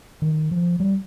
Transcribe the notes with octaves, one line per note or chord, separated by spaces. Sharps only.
D#3
F3
G3